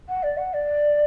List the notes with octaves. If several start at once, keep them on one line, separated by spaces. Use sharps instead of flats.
F#5
D5
F#5
D5